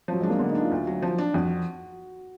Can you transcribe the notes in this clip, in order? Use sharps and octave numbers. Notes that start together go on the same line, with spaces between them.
F3 F#3
G#3 D4
A#3
D3 B3
D4 D#4
F4
D2
F#3
F3
D4
F2 F#4